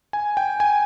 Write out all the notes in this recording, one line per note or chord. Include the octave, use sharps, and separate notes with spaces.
G#5
G5
G#5